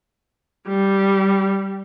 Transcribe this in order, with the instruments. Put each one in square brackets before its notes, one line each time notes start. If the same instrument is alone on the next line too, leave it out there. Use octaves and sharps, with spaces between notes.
[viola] G3